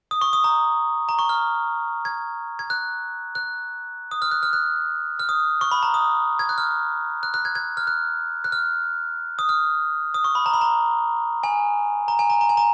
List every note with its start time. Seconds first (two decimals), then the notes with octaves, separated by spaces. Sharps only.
0.11 D#6
0.21 C#6
0.33 D#6
0.44 A#5
1.09 A#5
1.19 C#6
1.29 F6
2.05 G#6
2.59 G#6
2.70 F#6
3.35 F#6
4.11 D#6
4.22 F6
4.31 F#6
4.43 F6
4.53 F#6
5.20 F6
5.29 D#6
5.61 C#6
5.71 B5
5.83 A#5
5.94 D#6
6.39 G#6
6.49 F#6
6.58 F6
7.23 F#6
7.34 F#6
7.45 G#6
7.55 G#6
7.77 F6
7.87 F#6
8.44 F#6
8.52 F6
9.39 D#6
9.49 F6
10.14 D#6
10.24 C#6
10.35 B5
10.46 A#5
10.54 B5
10.61 A#5
11.43 G#5
12.08 A#5
12.19 G#5
12.30 A#5
12.41 A#5
12.49 G#5
12.57 A#5